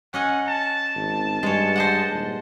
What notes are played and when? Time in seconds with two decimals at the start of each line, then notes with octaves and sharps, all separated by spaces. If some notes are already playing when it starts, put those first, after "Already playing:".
0.14 C#4 D#5 F#5 G#5
0.48 A5
0.95 G#1
1.43 G2 G#3 C#5
1.76 C5 D#5 F#5
2.10 D#1